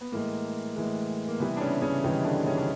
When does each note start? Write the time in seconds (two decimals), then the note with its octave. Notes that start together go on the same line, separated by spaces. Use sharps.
0.01 B3
0.12 A2 E3 G#3 A#3
0.76 A2 E3 G#3
1.28 A#3
1.40 C3 E3 G3 B3
1.57 D4
1.61 C#3 C#4
1.82 C#3 C#4
2.03 C3 D#3 E3 G3 D#4
2.24 D3 D4
2.46 C#3 C#4
2.57 D4